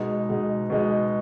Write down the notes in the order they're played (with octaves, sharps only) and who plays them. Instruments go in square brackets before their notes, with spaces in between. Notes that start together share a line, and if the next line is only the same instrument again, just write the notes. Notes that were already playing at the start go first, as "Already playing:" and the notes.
Already playing: [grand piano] B2 G#3 D#4
B2 G#3 D#4
B2 G#3 D#4